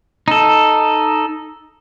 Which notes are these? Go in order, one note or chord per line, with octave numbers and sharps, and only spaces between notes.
D#4 A4